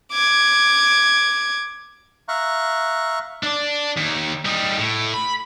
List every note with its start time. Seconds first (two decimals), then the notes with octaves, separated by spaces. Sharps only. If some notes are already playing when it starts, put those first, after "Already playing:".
0.12 D6 G#6
2.28 E5 F5 A#5 C#6 F#6
3.44 D4 D5
3.97 D#2
4.45 G3 D#4
4.77 A2
5.14 B5